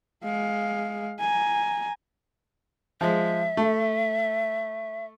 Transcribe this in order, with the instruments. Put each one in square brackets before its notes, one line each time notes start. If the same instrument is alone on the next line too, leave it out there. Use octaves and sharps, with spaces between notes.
[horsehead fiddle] G#3 F5
G#5 A#5
[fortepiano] F3 G#3 [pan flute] E5
[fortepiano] A3